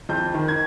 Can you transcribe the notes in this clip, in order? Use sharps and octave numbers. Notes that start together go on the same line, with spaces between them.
F2 G6
D#3
G#6